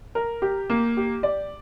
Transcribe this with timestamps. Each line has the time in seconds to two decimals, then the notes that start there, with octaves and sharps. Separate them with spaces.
0.15 A#4
0.42 G4
0.70 A#3
0.97 G4
1.23 D5